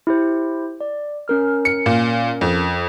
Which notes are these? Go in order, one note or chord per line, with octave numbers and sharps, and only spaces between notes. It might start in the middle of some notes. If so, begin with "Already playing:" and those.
E4 G4 C5
D5
C#4 A#4 F6
C#7
A#2
F2